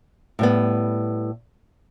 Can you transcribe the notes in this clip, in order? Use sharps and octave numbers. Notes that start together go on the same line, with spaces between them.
A2 G3 B3